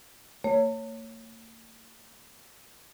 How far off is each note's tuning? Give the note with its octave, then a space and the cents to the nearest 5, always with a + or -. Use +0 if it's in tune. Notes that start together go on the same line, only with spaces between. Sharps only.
A#3 -45 C#5 +0